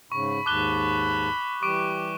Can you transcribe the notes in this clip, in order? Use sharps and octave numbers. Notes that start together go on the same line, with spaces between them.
G#2 C#3 B5 C#6
D#2 G#2 A5 D6 F#6 G7
E3 G3 G4 C#6 D6 D7